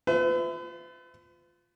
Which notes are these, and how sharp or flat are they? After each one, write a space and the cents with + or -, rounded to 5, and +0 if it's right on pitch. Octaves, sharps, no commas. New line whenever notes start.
F4 +0 B4 +40 E5 +0